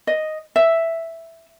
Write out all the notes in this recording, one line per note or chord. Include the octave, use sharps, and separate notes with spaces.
D#5
E5